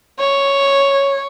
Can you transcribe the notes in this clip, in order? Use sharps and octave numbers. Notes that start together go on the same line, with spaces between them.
C#5